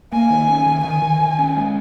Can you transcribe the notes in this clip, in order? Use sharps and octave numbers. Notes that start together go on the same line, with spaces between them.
A#3 G#5
D#3
C#4
D#3
D#3 G#5
D#3
D#3
C#4
G#3